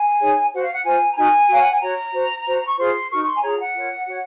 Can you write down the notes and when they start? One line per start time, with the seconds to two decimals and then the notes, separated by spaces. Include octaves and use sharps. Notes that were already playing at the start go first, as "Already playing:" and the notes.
Already playing: G#5
0.20 D#4 G#4 C#5
0.52 F#4 C5 F#5
0.63 F5
0.73 F#5
0.84 F4 C5 G#5
1.11 A#5
1.16 D#4 F#4 A#4 G#5
1.49 F#4 A#4 C#5 F5
1.61 F#5
1.71 G#5
1.81 F#4 C#5 A#5
2.14 F#4 C5
2.46 F#4 C5
2.66 C#6
2.78 F4 G#4 C5 C6
3.10 D#4 F#4 A#4 C#6
3.23 C#6
3.26 C6
3.35 G#5
3.43 F4 G#4 C#5 A#5
3.59 F#5
3.75 F4 A#4 C#5
4.07 F#4 C#5